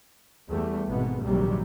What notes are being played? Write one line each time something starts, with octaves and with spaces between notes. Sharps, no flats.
E2 G3 A3
G#1 G#2 B2 B3
A#1 D#2 G#2 C3 F#3 G3